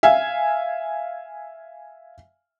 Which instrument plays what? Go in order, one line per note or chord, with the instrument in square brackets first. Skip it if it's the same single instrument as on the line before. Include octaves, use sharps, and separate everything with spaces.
[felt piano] E5 F5 G#5